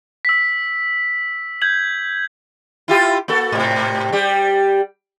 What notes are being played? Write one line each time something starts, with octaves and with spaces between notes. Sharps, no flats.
E6 B6
G6 G#6 F#7
E4 F4 G4
A#3 F#4 A4
G#2 C3
G3 G4